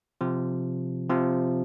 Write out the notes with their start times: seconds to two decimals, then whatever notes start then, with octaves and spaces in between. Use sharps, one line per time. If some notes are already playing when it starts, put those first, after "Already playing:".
0.21 C3 F3
1.10 C3 F3